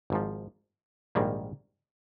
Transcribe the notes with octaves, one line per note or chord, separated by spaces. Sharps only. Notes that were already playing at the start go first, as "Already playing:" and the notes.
G#1 G#2 F3
A#1 G#2 D#3 G3 A#3